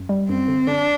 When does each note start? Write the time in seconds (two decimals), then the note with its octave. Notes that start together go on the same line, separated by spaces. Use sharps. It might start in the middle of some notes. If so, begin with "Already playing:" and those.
Already playing: F#2
0.09 G3
0.29 F#2 C4
0.48 D3
0.67 D3 D4